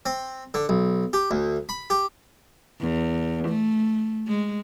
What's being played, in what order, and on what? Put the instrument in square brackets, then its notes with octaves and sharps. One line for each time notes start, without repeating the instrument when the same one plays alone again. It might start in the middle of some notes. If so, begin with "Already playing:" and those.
[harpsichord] C4
D3
B1
G4
D2
B5
G4
[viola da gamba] E2
A3
G#3